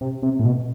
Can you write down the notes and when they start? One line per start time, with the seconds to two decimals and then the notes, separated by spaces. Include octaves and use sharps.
0.01 C3
0.23 C3
0.39 A2
0.45 B2